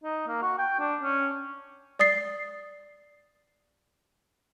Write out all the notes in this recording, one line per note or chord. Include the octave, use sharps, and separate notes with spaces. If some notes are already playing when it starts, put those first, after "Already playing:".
D#4
A#3
F#4
G5
D4
C#4
D5 D#6 A6 C7